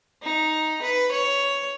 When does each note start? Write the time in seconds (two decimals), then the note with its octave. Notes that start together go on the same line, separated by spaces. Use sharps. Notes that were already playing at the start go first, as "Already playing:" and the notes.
0.23 D#4
0.82 B4
1.12 C#5